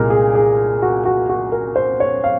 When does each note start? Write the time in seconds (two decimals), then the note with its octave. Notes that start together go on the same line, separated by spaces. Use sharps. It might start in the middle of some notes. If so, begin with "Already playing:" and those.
Already playing: C2 A#2 G#3 A#4
0.10 G#4
0.35 G#4
0.82 F#4
1.05 F#4
1.29 F#4
1.52 A#4
1.76 C5
2.00 C#5
2.24 F5